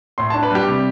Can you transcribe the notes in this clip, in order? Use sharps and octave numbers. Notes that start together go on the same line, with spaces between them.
A2 C6
D4 A5
B4
G3 G4
C3